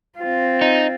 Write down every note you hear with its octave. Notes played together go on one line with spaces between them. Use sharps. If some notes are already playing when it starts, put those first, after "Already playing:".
C4 F4
D#4